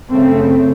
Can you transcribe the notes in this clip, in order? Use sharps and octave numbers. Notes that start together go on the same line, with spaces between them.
F#2 C#3 A3 C4